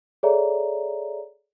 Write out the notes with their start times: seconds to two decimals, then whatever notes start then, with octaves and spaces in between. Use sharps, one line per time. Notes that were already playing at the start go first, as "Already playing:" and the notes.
0.23 G#4 A4 C#5 D5 E5 A#5